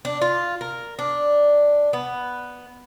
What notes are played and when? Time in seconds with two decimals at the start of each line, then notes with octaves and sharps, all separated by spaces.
0.05 D4
0.21 F4
0.61 A#4
0.99 D4
1.93 B3